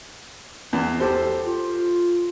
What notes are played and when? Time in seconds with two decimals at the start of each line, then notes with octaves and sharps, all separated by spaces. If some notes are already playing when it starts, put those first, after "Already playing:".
0.73 E2
1.00 G4 A4 C5
1.46 F4